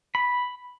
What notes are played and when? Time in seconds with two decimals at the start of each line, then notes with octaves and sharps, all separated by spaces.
0.15 B5